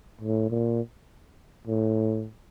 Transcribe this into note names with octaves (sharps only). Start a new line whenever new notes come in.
A2
A#2
A2